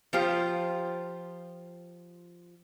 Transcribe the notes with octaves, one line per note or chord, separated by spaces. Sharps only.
F3 F4 G4 C5